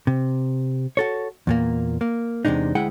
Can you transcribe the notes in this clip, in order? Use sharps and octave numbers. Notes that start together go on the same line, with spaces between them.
C3
F#4 A4 C#5
E2 A#2 A#3
A#3
E2 C3 G#3 D4 D#4
D2 G#3 E4 G#4 F#5 G5